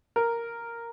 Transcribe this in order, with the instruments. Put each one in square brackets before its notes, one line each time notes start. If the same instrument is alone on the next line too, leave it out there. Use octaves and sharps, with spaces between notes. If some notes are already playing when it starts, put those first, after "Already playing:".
[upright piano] A#4